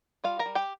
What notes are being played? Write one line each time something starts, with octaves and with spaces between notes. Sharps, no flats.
G3 F4 F5
A#4 A#5
G3
G4 G5